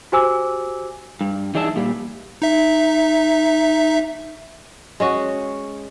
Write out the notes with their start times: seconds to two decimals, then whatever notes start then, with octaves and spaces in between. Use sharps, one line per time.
0.12 F#4 G4 C5 G#5 D6 E6
1.21 G2
1.55 E3 D#4 G#4 D5 E5 A5
1.76 A#2 G3
2.42 D#4 E5
5.00 G#3 C#4 F#4